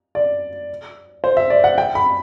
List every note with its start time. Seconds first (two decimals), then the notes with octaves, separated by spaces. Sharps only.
0.15 D5
1.24 C5
1.37 E5
1.50 D5
1.64 F#5
1.78 G5
1.95 B5